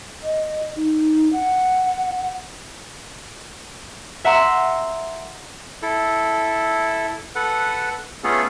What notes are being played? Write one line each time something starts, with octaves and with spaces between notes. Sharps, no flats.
D#5
D#4
F#5
E5 F#5 A#5 C6 E6
E4 A4
A4 B4 F#5
A3 B3 C#4 F4 G#4 A4